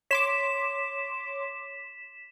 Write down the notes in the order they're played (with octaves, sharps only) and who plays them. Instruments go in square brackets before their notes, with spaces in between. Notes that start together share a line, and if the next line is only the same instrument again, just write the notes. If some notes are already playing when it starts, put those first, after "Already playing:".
[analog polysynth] C#5 C6 D6 [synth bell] B6 E7